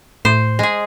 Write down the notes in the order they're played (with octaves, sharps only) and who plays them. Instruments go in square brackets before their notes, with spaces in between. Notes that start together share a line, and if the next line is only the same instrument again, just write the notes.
[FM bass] A2 [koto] C5
[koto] G#3 G#4